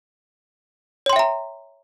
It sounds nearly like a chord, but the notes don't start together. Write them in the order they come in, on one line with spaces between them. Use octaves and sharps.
C#5 C6 G5 E5 A#5